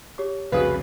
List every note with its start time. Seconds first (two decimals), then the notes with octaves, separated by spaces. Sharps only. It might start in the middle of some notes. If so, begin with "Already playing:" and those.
0.18 G4 C#5 D6
0.52 C2 F2 C#3 F#4 G#4 B4 F5